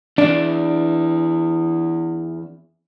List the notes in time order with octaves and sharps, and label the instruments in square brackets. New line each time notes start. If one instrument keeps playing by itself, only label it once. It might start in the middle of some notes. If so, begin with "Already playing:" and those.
[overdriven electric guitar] E2 [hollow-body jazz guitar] D4